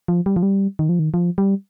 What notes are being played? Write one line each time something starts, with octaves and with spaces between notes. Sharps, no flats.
F3
G3
F3
G3
D#3
F3
D#3
F3
G3